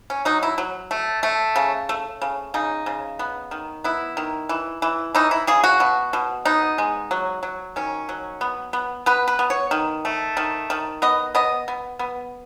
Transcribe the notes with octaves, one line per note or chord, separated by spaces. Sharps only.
C#4
F#3 D#4
E4
F#3
A3
A3
C#3
A3
C#3
C#3 D#4
C#3
B3
D#3
B3 E4
D#3
E3
E3
E3 D#4
E4
C#3 G#4
F#4
B2
B2
B3 D#4
G#3
F#3
F#3
D#3 C#4
F#3
B3
B3
B3 B4
B4
B3
C#5
D#3
A3
D#3
D#3
B3 D#5
B3 D#5
B3
B3